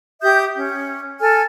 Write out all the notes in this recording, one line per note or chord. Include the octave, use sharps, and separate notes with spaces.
G4 E5 D#6 G6
C#4
A4 G#5 F6